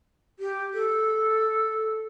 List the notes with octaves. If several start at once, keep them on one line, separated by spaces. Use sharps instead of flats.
G4
A4